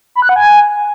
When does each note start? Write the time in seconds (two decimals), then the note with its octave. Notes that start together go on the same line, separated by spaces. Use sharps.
0.15 B5
0.22 F#6
0.29 F#5
0.36 G#5